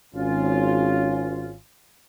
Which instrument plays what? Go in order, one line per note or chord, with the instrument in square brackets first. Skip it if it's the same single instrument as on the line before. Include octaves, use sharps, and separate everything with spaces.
[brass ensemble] G#1 C#4 F4